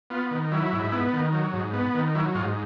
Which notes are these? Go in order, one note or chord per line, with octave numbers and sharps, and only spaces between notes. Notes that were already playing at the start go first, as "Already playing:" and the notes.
B3 F4
D#3
F#3 E4
G#2
B3
D#3
F#3
G#2
B3
D#3
F#3 E4
G#2 F4